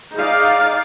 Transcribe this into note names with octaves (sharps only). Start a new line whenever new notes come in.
D#4 G#4 D5 F5